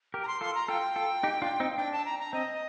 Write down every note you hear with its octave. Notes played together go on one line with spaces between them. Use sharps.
G4 A#4
A#5
C6
F4 A4 C6
A#5
F4 A4 G5
F4 A4
D#4 G4
D4 F4
C4 D#4
D4 G5
A5
A#5
A#5
C4 D#5